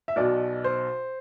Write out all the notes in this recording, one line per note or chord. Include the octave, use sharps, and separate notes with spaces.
E5
B1 B2 D5
C5